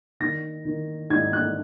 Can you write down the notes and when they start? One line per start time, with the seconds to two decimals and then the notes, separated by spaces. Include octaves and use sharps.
0.20 D#3 A#6
0.65 D#3
1.10 G#2 G#6
1.33 F#6